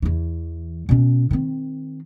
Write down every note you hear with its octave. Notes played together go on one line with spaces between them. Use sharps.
E2 E3
B2 C#4
D#3 C4